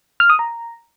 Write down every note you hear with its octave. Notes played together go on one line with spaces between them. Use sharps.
F6
D#6
A#5